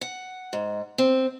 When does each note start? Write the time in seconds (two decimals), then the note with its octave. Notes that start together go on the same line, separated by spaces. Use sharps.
0.01 F#5
0.53 G#2
0.98 C4